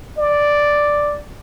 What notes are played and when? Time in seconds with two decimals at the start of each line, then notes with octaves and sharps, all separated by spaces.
0.18 D5